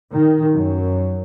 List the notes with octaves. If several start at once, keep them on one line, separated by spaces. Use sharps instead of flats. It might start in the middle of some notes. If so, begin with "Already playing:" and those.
D#3
F#2